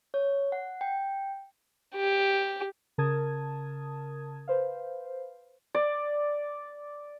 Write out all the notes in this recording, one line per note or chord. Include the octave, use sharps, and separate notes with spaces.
C#5
F#5
G5
G4
C#3 A#4 A5 D#6 G#6
B4 C5 F5
D5